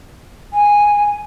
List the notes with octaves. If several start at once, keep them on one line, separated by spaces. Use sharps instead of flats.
G#5